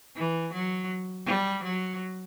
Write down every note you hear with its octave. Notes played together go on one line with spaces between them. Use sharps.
E3
F#3
G3
F#3